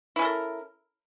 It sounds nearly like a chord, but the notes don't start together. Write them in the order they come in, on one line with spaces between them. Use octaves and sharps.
E4 C#4 A4 A#4